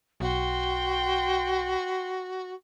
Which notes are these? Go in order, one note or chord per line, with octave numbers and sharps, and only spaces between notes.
B1 F#4 G5 C6